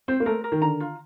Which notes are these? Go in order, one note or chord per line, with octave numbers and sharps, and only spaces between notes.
C4 C5
A#3
A3 A#4
A#4
D#3
D3 A#5
F4